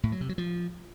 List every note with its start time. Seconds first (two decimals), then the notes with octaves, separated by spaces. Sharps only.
0.03 A2
0.12 F#3
0.21 C3
0.29 F#3
0.38 F3